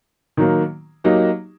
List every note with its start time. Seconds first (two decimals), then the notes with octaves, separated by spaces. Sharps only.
0.37 D#3 F#3 A#3
1.04 F#3 A#3 D#4 G4